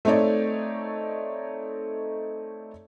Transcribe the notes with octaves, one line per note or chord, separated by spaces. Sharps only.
A3 C4 D#4 C#5 D5